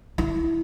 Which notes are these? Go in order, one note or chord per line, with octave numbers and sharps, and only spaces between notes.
E4